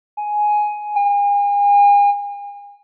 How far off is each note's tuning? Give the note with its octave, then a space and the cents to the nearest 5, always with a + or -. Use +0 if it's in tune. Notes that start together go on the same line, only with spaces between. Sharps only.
G#5 +10
G#5 -40